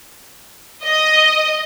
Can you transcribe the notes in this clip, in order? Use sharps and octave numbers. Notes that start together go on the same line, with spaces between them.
D#5